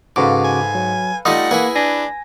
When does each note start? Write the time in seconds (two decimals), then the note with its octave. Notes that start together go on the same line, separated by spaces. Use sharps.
0.16 G#2 C#3 F#4 A4 B4 F5 D6
0.44 G#5
0.75 F#3
1.25 G3 A3 D#4 F4 D#5 F#5 D#6 A#6
1.51 A#3 E4 G#4 B4
1.76 D4 G#5 A#6